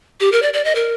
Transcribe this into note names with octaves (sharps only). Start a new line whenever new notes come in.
G4
A#4
D5
D5
D#5
A#4